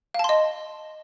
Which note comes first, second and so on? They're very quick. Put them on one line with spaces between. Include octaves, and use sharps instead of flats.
F5 A5 C6 D#5